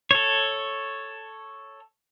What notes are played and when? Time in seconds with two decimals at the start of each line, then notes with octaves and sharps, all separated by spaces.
0.11 A4 C#5